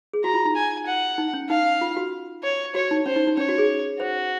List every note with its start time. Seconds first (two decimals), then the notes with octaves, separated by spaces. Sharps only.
0.13 G#4
0.24 F#4 A#5
0.34 F4
0.45 D#4
0.56 G#5
0.87 F#5
1.18 D#4
1.33 C#4
1.50 D#4 F5
1.81 F4
1.97 F#4
2.43 C#5
2.75 F#4 C#5
2.91 D#4
3.06 C#4 C5
3.16 D#4
3.27 D#4
3.37 C#4 C#5
3.49 F#4
3.58 G#4
4.00 F#4 C5